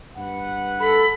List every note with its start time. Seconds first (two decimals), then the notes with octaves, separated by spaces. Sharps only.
0.17 G2 B4 F#5
0.80 A4 B5